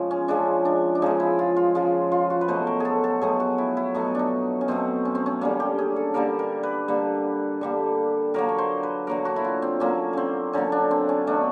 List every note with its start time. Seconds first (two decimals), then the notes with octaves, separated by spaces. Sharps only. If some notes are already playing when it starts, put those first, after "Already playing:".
Already playing: C#3 F3 G#3
0.11 C#4
0.28 C#3 F3 G#3 D4
0.65 D4
0.95 D4
1.02 C#3 F3 G#3 D#4
1.20 E4
1.39 F4
1.57 F4
1.75 C#3 F3 G#3 F4
2.12 F4
2.30 F#4
2.41 B4
2.48 B2 F#3 A3 C5
2.67 A#4
2.80 G#4 A4
3.04 A4
3.21 B2 F#3 A3 G#4
3.40 F#4
3.58 E4
3.77 E4
3.94 B2 F#3 A3 D#4
4.15 D4 D#4
4.61 C#4
4.68 B2 F#3 A3 C4
5.05 C#4
5.15 C4
5.26 C#4
5.41 D3 G3 A#3 C#4
5.60 G4
5.79 G#4
5.96 A4
6.14 D3 G3 A#3 A#4
6.39 A#4
6.63 B4
6.88 D3 G3 A#3
7.61 D3 G3 A#3
8.34 D3 F#3 A#3 A#4
8.49 C#5
8.58 C5
8.83 B4
9.07 D3 F#3 A#3 A#4
9.25 F#4
9.36 E4
9.45 F4
9.62 C4
9.80 D3 F#3 A#3 C#4
10.13 C4 C#4
10.53 D3 F#3 A#3 C#4
10.72 D4
10.91 C4
11.09 C#4
11.27 B2 F#3 A3 D4